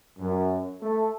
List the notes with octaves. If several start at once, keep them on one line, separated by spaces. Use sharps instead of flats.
F#2
A3 A4